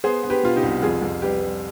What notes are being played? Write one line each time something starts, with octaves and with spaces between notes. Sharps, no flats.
B3 G#4 C5
B3
G4 B4
B2 F4
D#4 G4
C2
F2 F4 G#4
F2
G3 G4 B4
G3